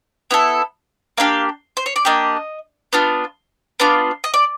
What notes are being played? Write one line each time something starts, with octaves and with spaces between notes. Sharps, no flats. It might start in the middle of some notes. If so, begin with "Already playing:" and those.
B3 E4 A4
A#3 D4 G4 F5
C5
C#5
D5
A#3 D4 G4 D#5
B3 D4 F4
B3 D4 F4 D5
D#5
D5